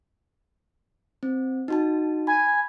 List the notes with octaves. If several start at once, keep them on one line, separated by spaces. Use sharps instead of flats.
C4
D#4 F#4 A5
G#5 B5